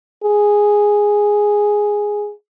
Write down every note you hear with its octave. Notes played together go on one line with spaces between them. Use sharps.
G#4